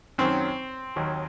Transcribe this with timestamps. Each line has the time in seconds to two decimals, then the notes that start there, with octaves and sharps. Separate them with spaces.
0.18 F#2 D#3 F#3 C4
0.96 D#2 D#3 F#3